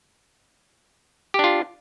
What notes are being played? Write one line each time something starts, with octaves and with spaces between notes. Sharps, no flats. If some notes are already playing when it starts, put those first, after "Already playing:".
D4 F4 G4